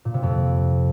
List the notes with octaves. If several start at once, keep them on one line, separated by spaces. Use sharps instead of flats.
A#2
C3
F2